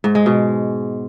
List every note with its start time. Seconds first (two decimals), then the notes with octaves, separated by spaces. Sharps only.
0.04 G#2
0.15 G#3
0.26 B2